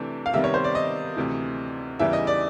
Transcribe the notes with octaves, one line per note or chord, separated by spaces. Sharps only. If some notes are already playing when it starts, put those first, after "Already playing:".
Already playing: C3 E3 A3 D4
F5
C3 D#3 G3 B3 E5
C#5
C5
D5
D#5
D2 C3 E3
E2 C#3 E3 G3 E5
D#5
D5